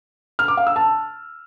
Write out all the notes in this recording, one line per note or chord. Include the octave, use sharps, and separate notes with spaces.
F6
D6
F5
E6
A5